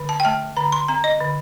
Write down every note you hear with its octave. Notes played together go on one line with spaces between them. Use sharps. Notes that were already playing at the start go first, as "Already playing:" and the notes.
Already playing: D3
A5
G5
A3 A5
D3 A#5
C6
C4 A#5
D#5
D3